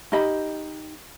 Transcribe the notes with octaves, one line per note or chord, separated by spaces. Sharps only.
D#4 G4 D#5 B5